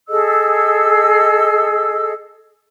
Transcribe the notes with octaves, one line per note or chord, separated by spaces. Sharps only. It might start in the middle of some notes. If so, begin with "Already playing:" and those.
G#4 A4 D#5 E6